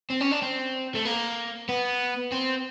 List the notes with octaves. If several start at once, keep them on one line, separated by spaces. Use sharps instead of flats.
C4
C#4
D4
C4
A3
A#3
B3
C4